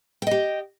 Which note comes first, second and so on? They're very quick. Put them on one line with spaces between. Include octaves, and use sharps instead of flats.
G5 D#5 G4